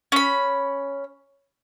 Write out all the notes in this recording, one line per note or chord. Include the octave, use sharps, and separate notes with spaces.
C#4 B5